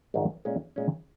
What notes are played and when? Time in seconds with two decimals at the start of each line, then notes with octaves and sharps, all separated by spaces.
0.14 A#1 G#2 D#3
0.45 A#2 G#3 C#4
0.76 A#2 G#3 C#4